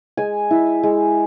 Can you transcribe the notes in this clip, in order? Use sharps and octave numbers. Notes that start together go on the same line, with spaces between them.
G#3 G#5
E4
G#3